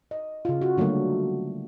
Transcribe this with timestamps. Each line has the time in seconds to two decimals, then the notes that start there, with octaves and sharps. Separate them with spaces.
0.11 D#5
0.45 C#3 F4
0.62 F#4
0.78 D3 F#3 G3 A3 A#3